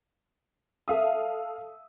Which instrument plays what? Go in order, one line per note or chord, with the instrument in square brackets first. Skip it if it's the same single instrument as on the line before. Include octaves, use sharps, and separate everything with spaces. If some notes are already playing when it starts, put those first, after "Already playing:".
[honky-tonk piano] A4 F5 D#6 [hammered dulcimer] E5